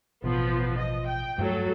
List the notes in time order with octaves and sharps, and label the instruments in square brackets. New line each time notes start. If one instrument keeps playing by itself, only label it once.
[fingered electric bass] A1 B2 [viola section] F3 B3
[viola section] D#5
G5
[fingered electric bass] G2 A3 [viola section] F#3 A4